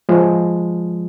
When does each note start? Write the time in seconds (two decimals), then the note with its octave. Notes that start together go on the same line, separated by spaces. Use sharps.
0.09 F3 G#3